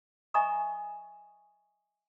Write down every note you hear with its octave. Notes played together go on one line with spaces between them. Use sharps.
D#5 E5 G#5 A#5 C#6 D#6